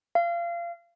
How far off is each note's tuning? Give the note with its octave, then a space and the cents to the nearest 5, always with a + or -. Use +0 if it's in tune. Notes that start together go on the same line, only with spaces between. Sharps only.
F5 -30